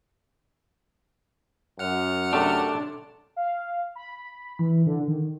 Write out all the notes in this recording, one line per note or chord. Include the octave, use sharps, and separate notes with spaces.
F#2 F#5 F6
C3 A3 D4 A4
F5
B5
E3
D3
D#3